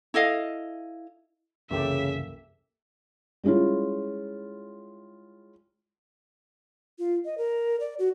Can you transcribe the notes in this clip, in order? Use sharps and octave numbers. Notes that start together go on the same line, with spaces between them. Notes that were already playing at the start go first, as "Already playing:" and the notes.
E4 A4 D#5 F5
C2 F#2 C#3 E3 A#3 G4 A4 E5
G3 G#3 C#4 E4 F4
F4
D#5
A#4
D5
F#4